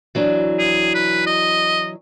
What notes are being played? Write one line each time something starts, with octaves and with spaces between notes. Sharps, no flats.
E3 F#3 D4
G#4
B4
D#5